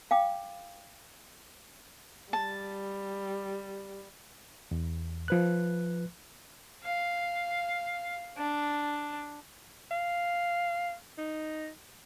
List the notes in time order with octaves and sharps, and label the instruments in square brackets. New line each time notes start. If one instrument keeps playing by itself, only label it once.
[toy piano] F5 G5 D6
[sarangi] G3 [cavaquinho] A5
[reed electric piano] E2
F3 B4 F#6
[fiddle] F5
D4
[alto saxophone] F5
D#4